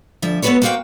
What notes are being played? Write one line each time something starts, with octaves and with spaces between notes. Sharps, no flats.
D2 F3 E5
A3 B3 C#4 F#4 B4 C#5
A#3 C4 F#4 G#4 F5 G5